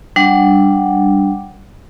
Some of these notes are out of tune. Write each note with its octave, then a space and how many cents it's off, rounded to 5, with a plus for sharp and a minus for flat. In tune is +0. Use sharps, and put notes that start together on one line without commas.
G3 +0 D4 +0 F#5 +0